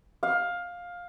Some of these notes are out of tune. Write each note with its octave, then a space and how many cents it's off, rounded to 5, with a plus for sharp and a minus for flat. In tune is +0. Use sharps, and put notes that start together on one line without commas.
F5 +15